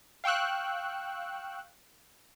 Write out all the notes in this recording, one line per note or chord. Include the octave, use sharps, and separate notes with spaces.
F5 G5 C#6 E6 F#6